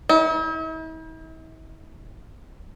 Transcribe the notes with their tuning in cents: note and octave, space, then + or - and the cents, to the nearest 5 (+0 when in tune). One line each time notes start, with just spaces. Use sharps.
E4 -45